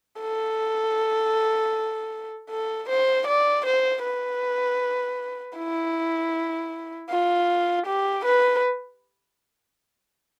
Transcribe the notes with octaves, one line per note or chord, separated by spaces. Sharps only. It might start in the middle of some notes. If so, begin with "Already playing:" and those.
A4
A4
C5
D5
C5
B4
E4
F4
G4
B4